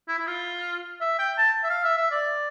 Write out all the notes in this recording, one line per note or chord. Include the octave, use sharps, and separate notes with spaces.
E4
E4
F4
E5
G5
A5
E5
F5
E5
E5
D5